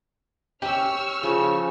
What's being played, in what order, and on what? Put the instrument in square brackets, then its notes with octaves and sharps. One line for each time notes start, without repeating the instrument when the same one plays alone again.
[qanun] C#4 [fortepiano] G4 [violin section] C#6 E6 F6
[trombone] C#3 [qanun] F3